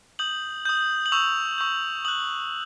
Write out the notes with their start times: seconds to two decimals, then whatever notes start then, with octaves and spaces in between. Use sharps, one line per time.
0.19 D#6 G6 F#7
0.65 D#6 G6
1.06 F#7
1.12 C#6 E6 G6 F7
1.58 C#6 E6 G6
2.05 D#6 F#6 F#7